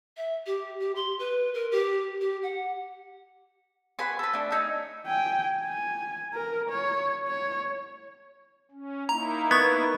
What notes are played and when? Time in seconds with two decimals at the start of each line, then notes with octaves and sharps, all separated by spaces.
0.17 E5
0.46 G4
0.80 G4
0.95 C6
1.19 B4
1.54 A#4
1.71 G4
2.21 G4
2.42 F#5
3.99 F#4 B4 G#5 C6
4.19 A4 B4
4.33 A3 D4
4.52 D#4 C#5 E6
5.06 G5 G#5
5.64 G#5
6.34 A#4
6.70 C#5
7.27 C#5
8.71 C#4
9.09 A#3 D#4 E4 A#5
9.51 B3 C#6 G#6